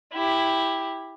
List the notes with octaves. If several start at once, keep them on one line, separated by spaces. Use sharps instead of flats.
E4 G4